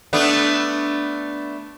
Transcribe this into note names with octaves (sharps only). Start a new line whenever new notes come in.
A3 B3 D4